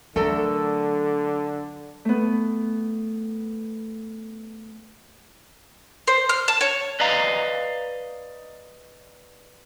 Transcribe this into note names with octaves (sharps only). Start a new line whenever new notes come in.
D3 F#3 A3 A4 A#4
A3 B3
C5
F6
A5
C#5
B4 D5 D#5 F5 A#5